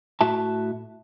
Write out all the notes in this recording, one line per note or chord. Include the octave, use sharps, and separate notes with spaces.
A2 F#4 E5 A5